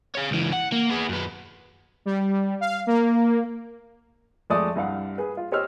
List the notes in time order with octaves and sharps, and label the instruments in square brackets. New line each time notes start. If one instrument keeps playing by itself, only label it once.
[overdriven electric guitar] C#5 F5
C#2 E3
F#5
A#3
B3 G#4
F#2 B3
[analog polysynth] G3
F5
A#3
[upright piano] F2 G#3 A3 D5 D#6
C2 G2 F5 F#5
G#4 B4
F4
G4 C5 C#5 D#5 E6 F6